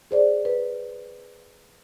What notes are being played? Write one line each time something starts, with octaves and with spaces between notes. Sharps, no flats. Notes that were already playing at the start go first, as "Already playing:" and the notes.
G#4 C5 D5
B4